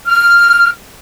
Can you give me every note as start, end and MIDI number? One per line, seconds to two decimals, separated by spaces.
0.07 0.69 89